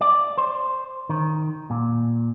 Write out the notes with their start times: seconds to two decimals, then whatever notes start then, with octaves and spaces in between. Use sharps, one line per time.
0.01 D5
0.38 C5
1.09 D#3
1.70 A#2